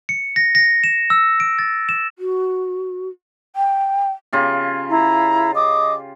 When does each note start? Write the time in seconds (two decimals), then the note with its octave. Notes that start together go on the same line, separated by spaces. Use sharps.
0.09 C#7
0.36 A#6
0.55 A#6
0.84 E7
1.10 E6
1.40 D7
1.59 A6
1.89 E7
2.19 F#4
3.56 G5
4.33 C#3 F4 G4
4.89 E4 A#5
5.54 D#5 D6 D#6